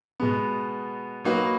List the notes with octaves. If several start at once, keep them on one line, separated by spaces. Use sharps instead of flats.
B2 G#3 B3
F#3 A#3 D#4 F#4 B4